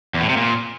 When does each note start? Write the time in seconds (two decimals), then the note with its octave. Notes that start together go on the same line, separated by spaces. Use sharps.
0.14 E2
0.22 A2
0.29 C3
0.37 A#2